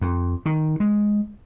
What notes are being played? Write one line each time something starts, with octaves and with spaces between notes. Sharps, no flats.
F2
D#3
G#3